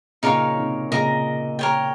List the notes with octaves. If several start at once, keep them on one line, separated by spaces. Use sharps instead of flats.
A#2 C#3 D#4 A#4 C#5 F5
C3 D#3
A#2 C#3 A#4 D#5 A#5
A#4 C#5 G5